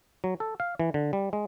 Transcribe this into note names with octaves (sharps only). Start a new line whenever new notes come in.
F#3
A4
F5
E3
D3
G3
G#3